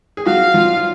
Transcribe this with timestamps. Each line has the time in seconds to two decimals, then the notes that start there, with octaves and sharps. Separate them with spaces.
0.17 G#4
0.26 F#3 F#4 F5
0.54 F3 F4
0.77 F4